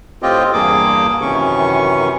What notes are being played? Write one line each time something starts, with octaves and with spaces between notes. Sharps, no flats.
A2 C4 F4 G4 D#5
E2 G2 A#3 G#4 D6
F#2 C3 D#3 E3 C#4 C#6